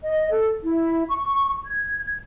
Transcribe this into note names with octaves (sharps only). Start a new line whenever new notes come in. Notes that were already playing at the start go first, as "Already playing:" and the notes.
D#5
A4
E4
C#6
G#6